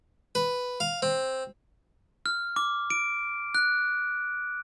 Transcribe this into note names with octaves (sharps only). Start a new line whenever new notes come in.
B4
F5
C4
F6
D6
D7
F#6